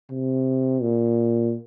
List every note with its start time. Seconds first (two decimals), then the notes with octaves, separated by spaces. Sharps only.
0.10 C3
0.82 A#2